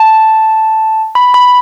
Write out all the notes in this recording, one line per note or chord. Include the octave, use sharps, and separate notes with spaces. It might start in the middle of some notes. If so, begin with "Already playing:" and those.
Already playing: A5
B5
B5